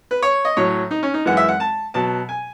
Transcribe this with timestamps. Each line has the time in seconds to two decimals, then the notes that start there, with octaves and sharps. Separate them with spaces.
0.11 B4
0.22 C#5
0.45 D#5
0.57 A2 F#3 C#5
0.91 D#4
1.03 C#4
1.14 D#4
1.25 F#2 E3 G#3 F#5
1.37 E5
1.48 F#5
1.60 A5
1.94 B2 F#3 A5
2.29 G#5